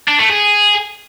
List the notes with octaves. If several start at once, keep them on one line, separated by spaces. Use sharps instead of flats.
D4
A3
G#4